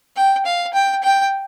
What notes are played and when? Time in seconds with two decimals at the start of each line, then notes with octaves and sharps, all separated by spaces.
0.16 G5
0.46 F5
0.74 G5
1.03 G5